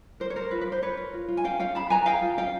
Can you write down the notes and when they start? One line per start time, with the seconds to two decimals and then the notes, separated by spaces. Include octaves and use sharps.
0.20 A#4 C5
0.30 C#5
0.36 A#4 C5
0.51 F4 B4
0.61 B4
0.67 A#4
0.72 C5
0.82 A#4 B4 C#5
0.97 A#4
1.14 F4
1.28 F4
1.37 G#5
1.44 C#4 F5 G5
1.59 C#4 F5 G5
1.75 G#4 A5 B5
1.90 B4 G#5 A#5
2.06 G#4 F5 G5
2.22 F4
2.37 C#4 F5 G5